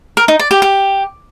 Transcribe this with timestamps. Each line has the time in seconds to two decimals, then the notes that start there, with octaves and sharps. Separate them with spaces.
0.17 A#4
0.28 D#4
0.39 D5
0.51 G4
0.62 G4